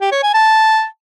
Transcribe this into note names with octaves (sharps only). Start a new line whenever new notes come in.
G4
C#5
G#5
A5